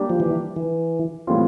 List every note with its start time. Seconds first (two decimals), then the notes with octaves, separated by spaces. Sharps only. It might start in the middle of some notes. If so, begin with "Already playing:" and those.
Already playing: G3 A#3 D4 G4
0.10 F3
0.20 E3
0.56 E3
1.27 A2 E3 G3 C4 F4